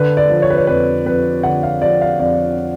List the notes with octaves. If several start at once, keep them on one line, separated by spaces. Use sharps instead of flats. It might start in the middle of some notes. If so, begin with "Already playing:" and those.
Already playing: D3 B4
D5
F3
C#5
B4
C#5
F2 B4
F2 B4
D3 F#5
F5
F3 D5
F5
F2 D5